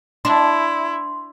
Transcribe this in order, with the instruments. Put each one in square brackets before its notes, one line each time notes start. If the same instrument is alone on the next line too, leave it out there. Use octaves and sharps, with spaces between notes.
[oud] D4 [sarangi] E4 [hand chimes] C6